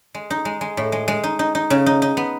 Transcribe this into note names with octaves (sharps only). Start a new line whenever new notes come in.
G#3
D#4
G#3
G#3
A2
G#3
G#3
D#4
D#4
D#4
C#3
D#4
D#4
B3